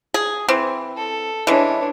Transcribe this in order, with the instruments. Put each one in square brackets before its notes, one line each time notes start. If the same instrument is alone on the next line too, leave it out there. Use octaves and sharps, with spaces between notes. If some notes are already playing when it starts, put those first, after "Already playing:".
[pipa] G#4
E3 C4
[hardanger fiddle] A4
[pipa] E3 G#3 [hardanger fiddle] D4 C#5